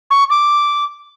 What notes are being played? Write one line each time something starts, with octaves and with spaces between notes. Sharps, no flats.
C#6
D6